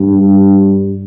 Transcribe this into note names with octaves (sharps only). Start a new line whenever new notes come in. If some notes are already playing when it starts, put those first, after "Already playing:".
Already playing: G2